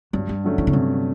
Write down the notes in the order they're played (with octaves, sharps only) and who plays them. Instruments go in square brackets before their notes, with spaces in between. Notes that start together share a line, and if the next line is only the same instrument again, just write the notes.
[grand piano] G2 [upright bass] F#3
[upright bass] G3
[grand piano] D3 F#3 A3 C#4
[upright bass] E3
C#3
[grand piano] G2 [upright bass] C3